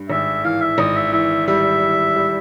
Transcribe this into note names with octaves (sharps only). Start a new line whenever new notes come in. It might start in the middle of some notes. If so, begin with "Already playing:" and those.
Already playing: G2
G#1 E5
E3 F5
E5
G#1 D#5
E5
E3 E5
G3 E5
E3
G3